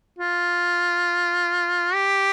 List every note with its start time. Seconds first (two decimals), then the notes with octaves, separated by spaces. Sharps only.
0.19 F4
1.94 G4